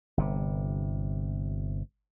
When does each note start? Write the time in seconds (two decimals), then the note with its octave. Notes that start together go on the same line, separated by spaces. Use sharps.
0.17 G1 C3